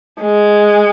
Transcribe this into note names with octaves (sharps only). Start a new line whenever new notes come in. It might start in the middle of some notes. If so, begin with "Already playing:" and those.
G#3